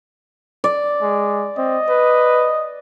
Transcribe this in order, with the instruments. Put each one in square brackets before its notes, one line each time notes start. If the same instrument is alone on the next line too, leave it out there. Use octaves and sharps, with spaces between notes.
[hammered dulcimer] D5
[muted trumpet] G#3
[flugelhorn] C4 [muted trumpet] D#5
[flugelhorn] B4